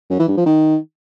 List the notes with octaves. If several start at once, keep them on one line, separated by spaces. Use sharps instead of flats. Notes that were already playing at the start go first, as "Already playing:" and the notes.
F#2
E3
G2
F3
D#3